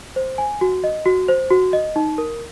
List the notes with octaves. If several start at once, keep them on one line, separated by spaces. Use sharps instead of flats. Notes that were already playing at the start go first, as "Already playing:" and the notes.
C5
G#5
F#4
D#5
F#4
C5
F#4
D#5
D#4
A#4